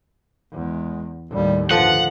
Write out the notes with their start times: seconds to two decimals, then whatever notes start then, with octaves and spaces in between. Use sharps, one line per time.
0.53 E2 G#3
1.31 D#2 A2 G3
1.71 G2 D3 F3 F#5